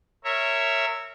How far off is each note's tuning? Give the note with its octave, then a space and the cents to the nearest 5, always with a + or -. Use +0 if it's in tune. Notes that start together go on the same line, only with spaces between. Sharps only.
A#4 -25 C#5 -5 E5 +0